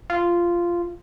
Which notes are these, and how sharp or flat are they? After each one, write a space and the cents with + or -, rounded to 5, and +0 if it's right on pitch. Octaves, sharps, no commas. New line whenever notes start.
F4 -10